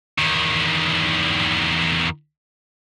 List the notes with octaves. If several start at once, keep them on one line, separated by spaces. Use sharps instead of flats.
E2 D#3